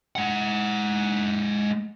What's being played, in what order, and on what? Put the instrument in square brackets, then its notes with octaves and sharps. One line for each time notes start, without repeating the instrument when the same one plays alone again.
[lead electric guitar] G#3 F#5